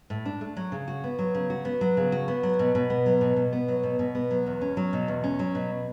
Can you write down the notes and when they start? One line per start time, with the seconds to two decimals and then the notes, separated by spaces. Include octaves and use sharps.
0.10 A2
0.25 D4
0.41 A3
0.57 F#3
0.72 C#3
0.88 F#4
1.04 B3
1.19 F#3
1.34 C#3
1.50 F#4
1.65 B3
1.81 F#3
1.97 C#3
2.12 F#4
2.28 B3
2.43 F#3
2.59 B2
2.75 B2
2.90 B3
3.06 F#3
3.21 B2
3.36 B2
3.53 B3
3.68 F#3
3.83 B2
3.99 B2
4.15 B3
4.31 F#3
4.46 E2
4.61 C#4
4.77 F#3
4.93 B2
5.08 E2
5.24 C#4
5.39 F#3
5.55 B2